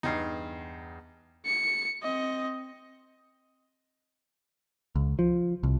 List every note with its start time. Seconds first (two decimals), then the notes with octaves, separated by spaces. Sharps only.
0.03 E2 G2 D#4 C7
1.46 C#7
2.03 C4 D#5
4.96 C#2
5.19 F3
5.63 C2